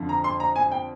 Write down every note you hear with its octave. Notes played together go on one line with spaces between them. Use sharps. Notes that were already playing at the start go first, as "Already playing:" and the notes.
Already playing: F2 D3 F3
A#5
C6
A#5
G#5
G5